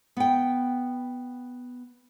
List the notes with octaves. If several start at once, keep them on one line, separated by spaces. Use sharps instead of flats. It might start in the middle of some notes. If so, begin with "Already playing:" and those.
B3 G5